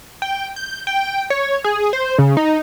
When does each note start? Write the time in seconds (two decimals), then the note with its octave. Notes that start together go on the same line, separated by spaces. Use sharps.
0.22 G5
0.56 G6
0.87 G5
1.30 C#5
1.64 G#4
1.93 C5
2.18 C#3
2.37 D#4